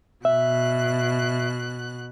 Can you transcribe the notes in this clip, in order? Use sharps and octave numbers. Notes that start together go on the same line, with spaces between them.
B2 E5 F#6